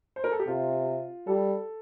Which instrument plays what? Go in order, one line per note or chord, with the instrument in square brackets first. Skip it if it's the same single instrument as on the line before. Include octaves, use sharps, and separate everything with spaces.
[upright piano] C5
A#4
A4
G4
[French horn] C3 [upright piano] F4
[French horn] G3 [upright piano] A4